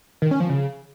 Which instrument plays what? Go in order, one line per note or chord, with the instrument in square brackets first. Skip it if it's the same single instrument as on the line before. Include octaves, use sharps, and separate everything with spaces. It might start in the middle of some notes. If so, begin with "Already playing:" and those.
[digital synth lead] D#3
C#4
F3
C#3